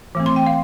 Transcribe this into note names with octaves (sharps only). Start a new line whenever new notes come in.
E3 A3 C4
C6
G5
F5